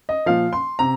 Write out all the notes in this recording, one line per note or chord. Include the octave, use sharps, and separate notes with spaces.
D#5
A#2 F3 F5
C6
C3 A#5